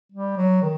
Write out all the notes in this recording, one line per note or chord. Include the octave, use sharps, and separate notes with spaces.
G3
F#3
D#3